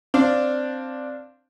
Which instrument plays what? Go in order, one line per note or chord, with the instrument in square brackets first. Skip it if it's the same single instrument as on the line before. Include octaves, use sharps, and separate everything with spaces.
[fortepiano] C4 D4 D5 F5